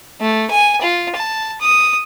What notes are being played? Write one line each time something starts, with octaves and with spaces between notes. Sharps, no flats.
A3
G#5
F4
A5
D#6